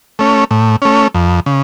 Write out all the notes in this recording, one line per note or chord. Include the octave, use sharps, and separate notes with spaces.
A3 C#4
A2
A3 C#4
F2
C#3